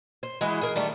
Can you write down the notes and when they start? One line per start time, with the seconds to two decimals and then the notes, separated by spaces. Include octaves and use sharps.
0.23 C5
0.41 E3 G#3 E4 F#4
0.61 G#4 A#4
0.76 D#3 G3 A3